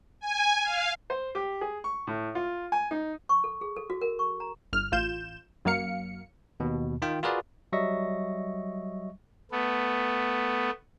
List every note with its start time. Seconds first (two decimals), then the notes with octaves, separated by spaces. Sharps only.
0.20 G#5
0.63 F5
1.10 C5
1.35 G4
1.61 G#4
1.84 C#6
2.07 A2
2.35 F4
2.72 G#5
2.91 D#4
3.29 C#6
3.44 A4
3.61 G#4
3.76 A4
3.90 F#4
4.01 A#4
4.19 C#6
4.40 A#5
4.73 G1 F6
4.92 A1 F4 G6 E7
5.65 F#2 F#3 A#3 F5 C#7
6.60 D#2 B2
7.02 D#3 F4 G5
7.23 F4 F#4 G#4 A#4 B4 D5
7.73 F#3 G3 D#5 E5 C#6 A#6
9.51 A3 B3